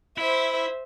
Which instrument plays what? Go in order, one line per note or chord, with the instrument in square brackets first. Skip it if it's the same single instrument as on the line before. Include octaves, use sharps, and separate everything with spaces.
[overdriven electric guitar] E4 [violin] C5 E5